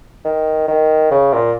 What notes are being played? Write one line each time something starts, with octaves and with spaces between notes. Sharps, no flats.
D#3
D#3
C#3
A#2